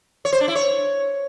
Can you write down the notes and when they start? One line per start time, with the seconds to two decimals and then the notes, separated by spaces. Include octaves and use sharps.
0.25 C#5
0.33 C5
0.40 D4
0.48 E4
0.55 C#5